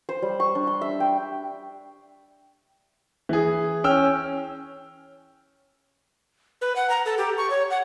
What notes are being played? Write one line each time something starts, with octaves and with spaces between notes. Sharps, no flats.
C5
G3
C#6
D4
C6
E5
G5
E3 G#4
C#4 G5 E6 F6
B4
F#5
A#5
A4
G4
C#6
C#5
F#5